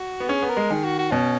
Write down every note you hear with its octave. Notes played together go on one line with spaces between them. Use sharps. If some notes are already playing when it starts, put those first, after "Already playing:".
Already playing: F#4
B3
C#4 G#4
B3
A#4
G#3
D#3 G#4
F#4
F#4
B2 C#4